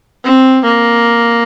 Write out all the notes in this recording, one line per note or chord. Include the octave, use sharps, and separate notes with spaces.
C4
A#3